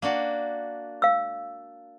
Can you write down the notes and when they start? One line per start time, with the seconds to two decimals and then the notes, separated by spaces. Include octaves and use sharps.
0.02 A#3 D4 F#4
1.02 F5 E6